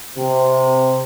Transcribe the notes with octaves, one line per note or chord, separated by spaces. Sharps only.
C3